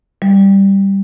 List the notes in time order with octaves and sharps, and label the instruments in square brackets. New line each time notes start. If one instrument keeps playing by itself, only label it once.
[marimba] G3